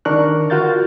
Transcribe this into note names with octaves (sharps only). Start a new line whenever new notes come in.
D3 D#3 D4 A#4 C#6 F#6
F4 F#4 A#4 F5 G6 A6